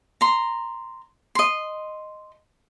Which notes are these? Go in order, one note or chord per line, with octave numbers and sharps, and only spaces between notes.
A#5 C6
D#5 C6